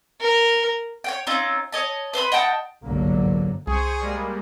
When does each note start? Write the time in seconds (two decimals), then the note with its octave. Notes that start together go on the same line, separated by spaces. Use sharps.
0.21 A#4
1.04 C#5 F#5 G5
1.27 C4 C#4 D#4 F4
1.73 C#5 D#5 A5
2.13 B4 C5 A5 B5
2.32 D#5 F#5 G5 A5
2.84 G1 C2 G#2 D3 F#3 A#3
3.67 C2 G#4 C5 G#5 C#6
4.00 G3 G#3 A#3